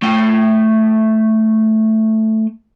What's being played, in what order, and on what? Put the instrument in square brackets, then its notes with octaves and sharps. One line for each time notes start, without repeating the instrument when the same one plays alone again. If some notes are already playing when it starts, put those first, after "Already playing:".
[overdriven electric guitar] A3 G5